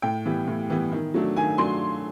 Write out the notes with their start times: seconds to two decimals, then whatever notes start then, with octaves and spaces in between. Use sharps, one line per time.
0.02 A2 G5
0.26 E3 G3 B3
0.48 A2
0.70 E3 G3 B3
0.92 D#3
1.14 F#3 A3 D4
1.36 D#3 G#5
1.58 F#3 A3 D4 C6